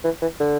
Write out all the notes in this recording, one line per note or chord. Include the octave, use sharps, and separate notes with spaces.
E3
E3
D3